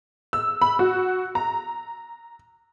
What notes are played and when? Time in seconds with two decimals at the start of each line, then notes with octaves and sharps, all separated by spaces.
0.33 E6
0.62 B5
0.79 F#4
1.35 A#5